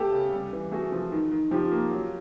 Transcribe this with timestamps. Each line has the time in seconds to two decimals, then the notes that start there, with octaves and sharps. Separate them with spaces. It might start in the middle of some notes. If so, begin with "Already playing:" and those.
Already playing: A3 B3 G4 A4
0.12 C#3
0.33 G3
0.53 E3
0.72 A3 F#4 G#4
0.92 F3
1.12 D#3
1.32 D#3
1.51 F3 F4 G4
1.72 A#3
1.91 F#3